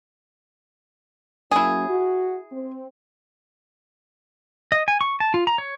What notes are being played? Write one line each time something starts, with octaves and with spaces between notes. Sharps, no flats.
F#3 A#3 C#4 E4 G#4
F#4
C4
D#5
G#5
C#6
A5
F4
A#5
C#5